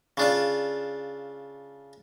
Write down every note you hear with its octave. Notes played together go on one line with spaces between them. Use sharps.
C#3 D4 F4